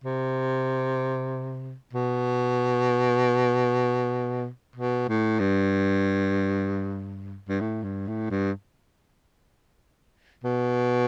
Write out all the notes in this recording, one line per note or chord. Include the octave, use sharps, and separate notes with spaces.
C3
B2
B2
A2
G2
G2
A2
G2
A2
G2
B2